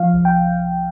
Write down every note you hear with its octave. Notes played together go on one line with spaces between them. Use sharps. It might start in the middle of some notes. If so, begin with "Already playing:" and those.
Already playing: F3 F5
C2
G5